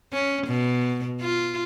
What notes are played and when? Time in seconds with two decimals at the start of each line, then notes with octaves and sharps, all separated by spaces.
0.13 C#4
0.48 B2
1.21 F4